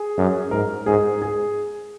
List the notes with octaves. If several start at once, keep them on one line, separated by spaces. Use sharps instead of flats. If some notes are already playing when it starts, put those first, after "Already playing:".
Already playing: G#4
F#2
G#2 A#4
G#2 G#4
G#4